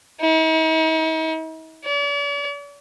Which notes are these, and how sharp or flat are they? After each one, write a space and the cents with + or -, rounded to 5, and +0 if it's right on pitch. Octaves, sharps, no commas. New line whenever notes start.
D#4 +45
D5 -45